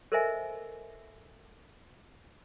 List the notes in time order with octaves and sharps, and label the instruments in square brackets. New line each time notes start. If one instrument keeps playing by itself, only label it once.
[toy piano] A4 A#4 C5 D#5 E5 G#5